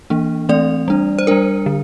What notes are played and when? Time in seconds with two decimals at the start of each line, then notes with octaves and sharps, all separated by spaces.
0.10 E3 A#3 D4
0.49 E3 A3 C4 D5
0.88 G3 D4
1.19 C5
1.27 G3 D4 A#4
1.66 D3